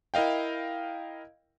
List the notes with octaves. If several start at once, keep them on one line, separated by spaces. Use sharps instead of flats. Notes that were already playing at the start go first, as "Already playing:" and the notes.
E4 A#4 D#5 F5 G5